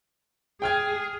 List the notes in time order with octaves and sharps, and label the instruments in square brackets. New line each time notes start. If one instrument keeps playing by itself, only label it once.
[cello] G#4 [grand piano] G5 F6 G#6